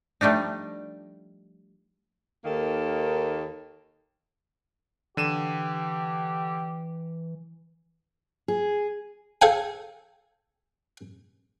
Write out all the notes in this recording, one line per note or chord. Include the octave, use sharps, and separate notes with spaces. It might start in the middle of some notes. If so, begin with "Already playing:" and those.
F3 G3 A3 D4 D#4
D#2 D#3 A#3 A4
D3 E3 G4 D#7 E7
G#4
G#4 A4 F5 G5 G#5